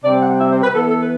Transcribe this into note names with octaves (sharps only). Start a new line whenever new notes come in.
C3 G3 C4 D5
F#5
E5
C5
B4
E3 B3 A4
A4
B4